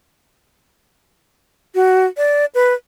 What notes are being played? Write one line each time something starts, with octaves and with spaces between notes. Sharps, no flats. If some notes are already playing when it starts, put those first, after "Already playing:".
F#4
D5
B4